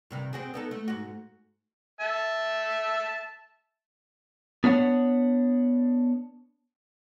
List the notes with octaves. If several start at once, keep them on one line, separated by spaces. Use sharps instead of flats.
G2 C3 D#3
C4 F#4 G#4
B3 D#4 A4
A3
G#2 F#4
E5 A5
B3 D4 C#5 F#5